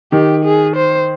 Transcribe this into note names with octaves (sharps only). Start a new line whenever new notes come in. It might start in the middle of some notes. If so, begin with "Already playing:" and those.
D#3 G4
G#4
C5